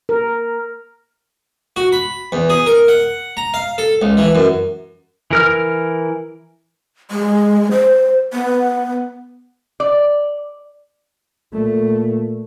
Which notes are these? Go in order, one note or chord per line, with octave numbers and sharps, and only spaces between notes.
A#4
F#4
B5
E2
G#4
A#4
F#5
A#5
F5
A4
C#2
E3
F#2
E3 A#4 F6
G#3
C5
B3
D5
A#2 A3